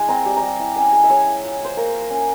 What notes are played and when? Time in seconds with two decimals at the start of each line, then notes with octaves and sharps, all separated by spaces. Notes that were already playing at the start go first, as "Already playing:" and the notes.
Already playing: G#3 E4 G#5
0.09 C4 A#5
0.26 G3
0.36 A#5
0.42 G3
0.59 E4
0.76 C#4 G#5
0.92 G#3
1.04 E5
1.10 G#3 C#5
1.26 E4
1.43 F4
1.60 F4 C5
1.77 A#3 A#4
1.93 A#3
2.10 C#4